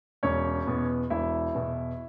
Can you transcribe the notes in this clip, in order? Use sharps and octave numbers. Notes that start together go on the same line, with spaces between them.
E1 C#4 C#5
E2 B2 B3
E1 E4 E5
E2 B2 B3